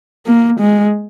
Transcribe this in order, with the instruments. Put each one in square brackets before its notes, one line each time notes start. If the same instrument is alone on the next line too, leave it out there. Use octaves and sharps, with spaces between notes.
[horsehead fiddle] A#3
G#3